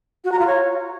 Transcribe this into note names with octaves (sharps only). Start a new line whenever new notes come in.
F#4
A#5
F4
C#5